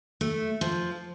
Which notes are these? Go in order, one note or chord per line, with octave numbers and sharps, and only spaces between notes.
A3
F3